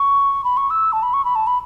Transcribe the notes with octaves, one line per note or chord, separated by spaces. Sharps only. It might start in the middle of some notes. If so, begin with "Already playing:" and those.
Already playing: C#6
B5
C#6
E6
A5
B5
C#6
B5
A5
B5